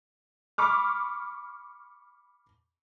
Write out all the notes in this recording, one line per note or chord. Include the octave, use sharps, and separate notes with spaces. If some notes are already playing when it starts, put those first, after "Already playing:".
B5 C#6 D6 F6